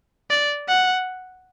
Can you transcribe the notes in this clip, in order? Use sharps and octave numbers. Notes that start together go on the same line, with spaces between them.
D5
F#5